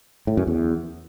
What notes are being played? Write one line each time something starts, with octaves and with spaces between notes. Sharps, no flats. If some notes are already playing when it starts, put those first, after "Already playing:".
A2
F#2
E2